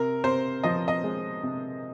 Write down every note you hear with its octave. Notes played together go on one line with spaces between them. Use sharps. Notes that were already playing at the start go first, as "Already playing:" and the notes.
Already playing: C3 A#4
C3 C5
F3 D#5
D#5
G#3
C3